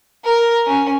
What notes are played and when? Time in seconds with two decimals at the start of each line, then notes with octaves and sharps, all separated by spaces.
0.25 A#4
0.67 C#4